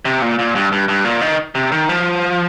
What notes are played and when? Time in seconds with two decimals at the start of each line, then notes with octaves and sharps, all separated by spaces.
0.05 C3
0.22 A#2
0.39 A#2
0.55 G2
0.72 G2
0.88 G2
1.05 A#2
1.21 D#3
1.55 C3
1.72 D#3
1.89 F3